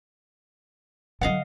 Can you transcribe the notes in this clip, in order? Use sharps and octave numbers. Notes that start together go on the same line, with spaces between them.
D3 F#3 D#5 F5 F#5